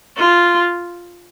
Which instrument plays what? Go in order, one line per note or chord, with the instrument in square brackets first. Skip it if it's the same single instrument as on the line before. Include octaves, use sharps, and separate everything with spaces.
[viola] F4